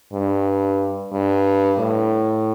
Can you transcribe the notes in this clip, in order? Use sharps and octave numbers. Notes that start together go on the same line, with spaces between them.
G2
G2
A2